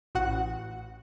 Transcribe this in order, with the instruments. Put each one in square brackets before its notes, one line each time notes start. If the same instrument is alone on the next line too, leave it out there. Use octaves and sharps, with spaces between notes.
[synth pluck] A1 F#4 F#5